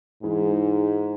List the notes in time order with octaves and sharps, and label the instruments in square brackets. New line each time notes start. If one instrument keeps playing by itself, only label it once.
[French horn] G#2 [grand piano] E3 G#3 E4 G#4